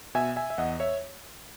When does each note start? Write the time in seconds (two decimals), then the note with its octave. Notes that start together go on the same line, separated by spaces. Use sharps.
0.15 B2 E5 G#5
0.36 E5 G#5
0.50 E5
0.58 E2 D#5 F#5
0.80 C#5 E5